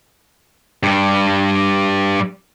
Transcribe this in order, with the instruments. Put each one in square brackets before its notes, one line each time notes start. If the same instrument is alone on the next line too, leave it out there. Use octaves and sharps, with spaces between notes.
[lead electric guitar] G2 G3